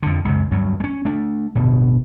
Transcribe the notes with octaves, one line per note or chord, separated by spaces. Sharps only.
F2 D3
C#2 F#2 C3
D2 G2 F#3
G#3 C#4
A3 D4
D1 G1 B2